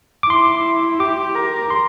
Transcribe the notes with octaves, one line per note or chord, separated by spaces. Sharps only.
D6
E4 C6
G4 D6
A#4
C6